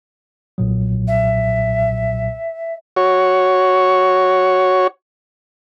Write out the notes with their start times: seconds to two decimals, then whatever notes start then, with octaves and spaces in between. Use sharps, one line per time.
0.58 B1 A#2 F#3
1.07 E5
2.97 F#4 C#5